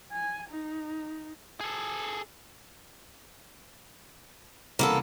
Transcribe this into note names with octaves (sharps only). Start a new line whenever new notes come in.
G#5
D#4
G#4 A4
C2 C#3 E3 A#3 B3 A4